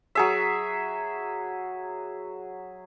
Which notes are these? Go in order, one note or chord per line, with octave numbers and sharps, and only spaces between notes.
F#3 G#4 E5